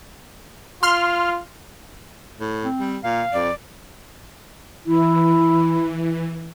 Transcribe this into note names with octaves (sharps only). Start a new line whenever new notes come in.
F4 C6 F6
A2
C4
G3
A#2 F5
F2 D5
E3 E4